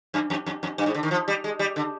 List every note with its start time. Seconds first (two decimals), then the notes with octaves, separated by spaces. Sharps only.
0.14 F#2
0.30 F2
0.46 F2
0.63 F2
0.78 G2
0.86 G#2
0.95 D3
1.03 D#3
1.11 F3
1.28 G3
1.44 G#3
1.59 G3
1.76 D3